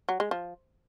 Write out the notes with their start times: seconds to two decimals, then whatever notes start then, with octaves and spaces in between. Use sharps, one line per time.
0.09 F#3
0.20 G#3
0.31 F3